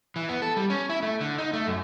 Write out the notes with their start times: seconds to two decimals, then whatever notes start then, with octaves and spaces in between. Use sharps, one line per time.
0.16 E3
0.29 B3
0.42 A4
0.57 G3
0.70 C#4
0.90 E4
1.03 A3
1.21 D3
1.38 D#4
1.53 A3
1.67 F#2